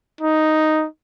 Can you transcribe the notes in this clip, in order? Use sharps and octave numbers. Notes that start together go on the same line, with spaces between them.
D#4